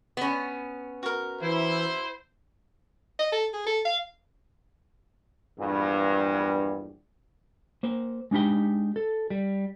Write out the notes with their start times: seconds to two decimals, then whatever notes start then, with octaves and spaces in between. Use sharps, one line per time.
0.17 B3 C#4
1.03 F#4 A#4
1.41 E3 E4 C5
3.19 D#5
3.32 A4
3.54 G#4
3.67 A4
3.85 F5
5.59 A#1 E2 G2
7.83 A#3 C5
8.31 G#3 D4 D#4 G4 G5
8.96 A4
9.30 G3